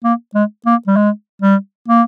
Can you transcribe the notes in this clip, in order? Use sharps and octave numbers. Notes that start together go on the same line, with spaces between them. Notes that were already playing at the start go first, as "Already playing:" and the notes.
A#3
G#3
A#3
G3
G#3
G3
A#3